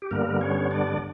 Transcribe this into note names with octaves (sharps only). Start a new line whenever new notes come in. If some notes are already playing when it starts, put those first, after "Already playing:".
G4
G2 D3 G3 A#3 B3 A#4
C#4 C#5
D4 D5